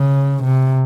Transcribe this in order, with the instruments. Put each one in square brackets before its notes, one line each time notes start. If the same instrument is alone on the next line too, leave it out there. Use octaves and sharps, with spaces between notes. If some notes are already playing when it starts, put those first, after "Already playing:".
Already playing: [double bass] C#3
C3